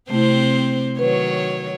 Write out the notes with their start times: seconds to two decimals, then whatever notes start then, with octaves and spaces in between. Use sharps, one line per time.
0.10 C3 A3 C4 E4 C5
0.99 D#3 F#3 B4 C#5